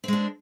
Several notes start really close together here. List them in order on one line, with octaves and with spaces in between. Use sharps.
C4 G#3 D4